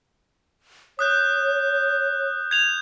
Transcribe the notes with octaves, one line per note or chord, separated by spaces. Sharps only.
C#5 D#6 F#6 G6
G#6 F7